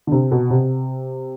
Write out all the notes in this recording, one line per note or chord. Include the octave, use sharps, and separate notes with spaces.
D3
C3
B2
C3